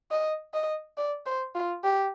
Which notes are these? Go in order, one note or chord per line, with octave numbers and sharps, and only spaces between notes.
D#5
D#5
D5
C5
F4
G4